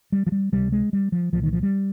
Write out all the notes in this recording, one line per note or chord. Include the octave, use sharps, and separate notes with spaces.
G3
F3
G3
C#2 C3 G3
G#3
G3
F3
C2 A#2 F3
D#3
F3
G3